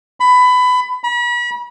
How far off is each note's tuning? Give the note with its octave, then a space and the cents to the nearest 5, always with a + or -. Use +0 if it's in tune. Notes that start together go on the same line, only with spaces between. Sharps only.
B5 +20
B5 -40